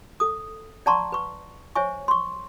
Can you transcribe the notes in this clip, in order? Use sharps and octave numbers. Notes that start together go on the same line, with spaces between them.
A4 D#6
D5 F#5 A5 A#5 C6 C#6
B4 C#6
C5 C#5 E5 G#5 C#6
C6 C#6